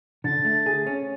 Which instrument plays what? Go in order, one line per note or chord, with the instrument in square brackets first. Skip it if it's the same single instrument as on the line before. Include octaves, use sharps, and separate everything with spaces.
[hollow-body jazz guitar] D3 [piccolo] A6
[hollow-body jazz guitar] A3
G#4
C#4